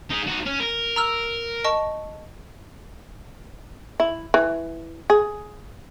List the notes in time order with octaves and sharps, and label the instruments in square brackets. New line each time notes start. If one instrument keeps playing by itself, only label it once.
[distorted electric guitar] D#4 G#4
D#4 F#4
C#4
A#4
[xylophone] A#5 E6 F6
D#5 A5 C#6
[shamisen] E4
E3
G#4